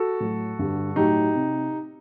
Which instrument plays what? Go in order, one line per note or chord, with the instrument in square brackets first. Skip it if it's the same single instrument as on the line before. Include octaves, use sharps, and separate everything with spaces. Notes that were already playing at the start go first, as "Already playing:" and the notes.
Already playing: [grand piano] F#4 A4
A2 F#3
G2 D3 G3
A2 F#3 D#4 G4
C3